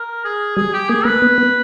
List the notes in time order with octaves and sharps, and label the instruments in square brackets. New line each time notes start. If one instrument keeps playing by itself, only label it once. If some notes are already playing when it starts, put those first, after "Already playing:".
Already playing: [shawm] A#4
G#4
[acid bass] G3 [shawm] G#4
[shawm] G4
[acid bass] A#3 [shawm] G#4
[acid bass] A#3 [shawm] B4
[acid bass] B3
B3